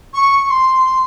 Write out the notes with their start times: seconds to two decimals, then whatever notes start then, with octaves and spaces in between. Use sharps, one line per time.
0.14 C#6
0.50 C6